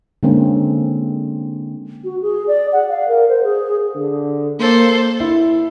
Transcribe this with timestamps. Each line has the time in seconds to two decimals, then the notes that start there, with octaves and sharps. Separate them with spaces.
0.23 D3 G#3 A#3 C4 C#4
2.04 F#4
2.22 G#4
2.48 D5
2.73 F#5
2.90 F5
3.08 A#4
3.29 C5
3.44 G#4
3.96 D3
4.60 A#3 A4 C5
5.20 E4